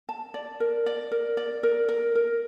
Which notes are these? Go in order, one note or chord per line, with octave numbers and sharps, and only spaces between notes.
A5
D5
A#4
D5
A#4
D5
A#4
A#4
A#4